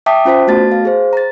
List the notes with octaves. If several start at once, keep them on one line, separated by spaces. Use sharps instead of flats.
E5 G5 A5 D6 D#6 B6
C#4 F4 C5 A5 B6
A3 B3 F#4 A5 A6
F5
G#4 C5
A#5 A6